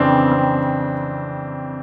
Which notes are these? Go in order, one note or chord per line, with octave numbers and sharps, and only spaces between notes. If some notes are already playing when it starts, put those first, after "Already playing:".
Already playing: F2 C#3 E3 C4 D4
C4